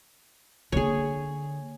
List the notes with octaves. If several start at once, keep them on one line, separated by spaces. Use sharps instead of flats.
D3 A#3 G#4 C#5